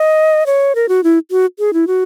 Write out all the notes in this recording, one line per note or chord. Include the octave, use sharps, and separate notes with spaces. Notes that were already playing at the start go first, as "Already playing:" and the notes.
Already playing: D#5
C#5
A#4
F#4
E4
F#4
G#4
E4
F#4